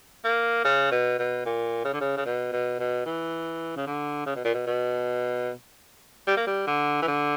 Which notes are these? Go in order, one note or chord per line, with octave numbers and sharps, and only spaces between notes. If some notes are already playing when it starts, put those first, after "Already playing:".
A#3
C#3
B2
B2
A#2
C#3
D3
C#3
C#3
B2
B2
B2
E3
C#3
D3
C#3
B2
A#2
B2
B2
G3
A#3
G3
D3
E3
D3